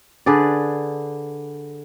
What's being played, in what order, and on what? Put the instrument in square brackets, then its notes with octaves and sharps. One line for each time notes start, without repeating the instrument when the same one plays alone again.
[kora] D3 G#4 B4 D5